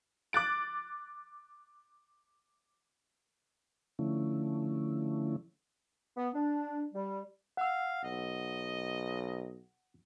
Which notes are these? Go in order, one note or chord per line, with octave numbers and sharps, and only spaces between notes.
D6 F#6 A6 D7
D3 F3 A3 C#4 E4
B3
D4
G3
F5 F#5 E6
B1 D#5